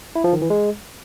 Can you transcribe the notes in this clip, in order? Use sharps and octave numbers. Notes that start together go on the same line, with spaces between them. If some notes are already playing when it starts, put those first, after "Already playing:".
E4
F3
D#3
E3
G#3